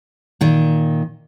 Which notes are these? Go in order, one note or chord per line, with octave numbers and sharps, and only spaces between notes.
A#2 D#3